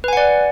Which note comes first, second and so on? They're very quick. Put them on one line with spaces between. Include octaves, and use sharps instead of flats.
B4 G#5 F#5 D5